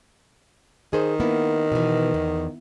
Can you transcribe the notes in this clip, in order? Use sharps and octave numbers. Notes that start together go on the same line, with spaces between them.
D#3 G#4 C5
A#3 B3 E4
B2 E3
E2